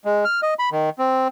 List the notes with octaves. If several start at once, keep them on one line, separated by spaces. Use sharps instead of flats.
G#3
F6
D#5
B5
D#3
C4